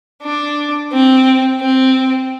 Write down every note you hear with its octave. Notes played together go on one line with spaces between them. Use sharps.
D4
C4
C4